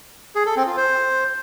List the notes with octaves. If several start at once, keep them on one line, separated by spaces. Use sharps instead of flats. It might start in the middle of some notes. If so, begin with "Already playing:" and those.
G#4
A4
C4
F4
C5